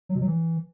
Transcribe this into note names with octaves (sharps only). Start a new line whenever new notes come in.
F#3
B2
F#3
E3